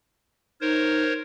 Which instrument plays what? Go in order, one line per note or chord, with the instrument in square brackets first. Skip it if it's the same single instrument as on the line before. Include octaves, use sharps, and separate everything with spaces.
[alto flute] D#4 [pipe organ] A#4 C5 C#5